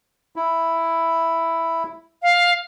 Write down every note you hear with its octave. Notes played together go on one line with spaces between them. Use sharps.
E4
F5